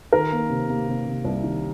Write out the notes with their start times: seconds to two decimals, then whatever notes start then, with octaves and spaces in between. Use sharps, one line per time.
0.13 D#3 A#4
0.32 A#3
0.50 C3
0.69 A#3
0.88 C3
1.06 C3
1.25 C2
1.44 D#3